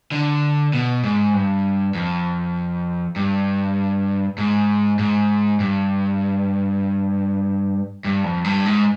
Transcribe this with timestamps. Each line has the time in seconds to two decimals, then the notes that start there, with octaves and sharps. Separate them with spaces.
0.12 D3
0.73 B2
1.04 G#2
1.34 G2
1.95 F2
3.16 G2
4.38 G#2
4.99 G#2
5.60 G2
8.05 G2
8.24 F2
8.44 G2
8.65 G#2